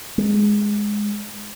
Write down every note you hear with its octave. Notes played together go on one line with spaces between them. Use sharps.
G#3